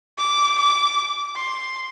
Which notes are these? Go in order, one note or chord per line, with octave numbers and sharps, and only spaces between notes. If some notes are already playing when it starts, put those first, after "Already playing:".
D6
D6
C6